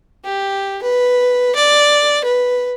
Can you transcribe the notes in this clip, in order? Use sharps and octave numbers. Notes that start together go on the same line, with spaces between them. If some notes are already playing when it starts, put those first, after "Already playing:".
G4
B4
D5
B4